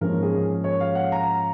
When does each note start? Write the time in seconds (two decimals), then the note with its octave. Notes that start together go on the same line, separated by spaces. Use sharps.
0.01 G#2 F3 A#3 C#4 A#4
0.23 G#4
0.64 C#5
0.81 F5
0.95 F#5
1.12 A#5